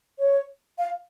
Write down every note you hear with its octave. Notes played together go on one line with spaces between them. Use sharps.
C#5
F5